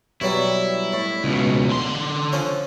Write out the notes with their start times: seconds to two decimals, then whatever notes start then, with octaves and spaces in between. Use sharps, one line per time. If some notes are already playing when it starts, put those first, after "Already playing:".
0.21 B2 F#3 G3 E4
0.93 A2
1.24 C#2 B2
1.69 D3 C6
2.32 F3 C#4 C5